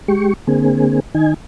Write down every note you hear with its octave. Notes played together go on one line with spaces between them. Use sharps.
G#3 G4 C#6
D3 A#3 C4 G#4
D#3 D#4 G#5